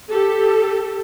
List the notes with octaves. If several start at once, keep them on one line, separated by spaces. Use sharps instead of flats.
G4 A4